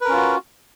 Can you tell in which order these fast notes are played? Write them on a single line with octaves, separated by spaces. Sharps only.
B4 A#4 C#4 F4 F#4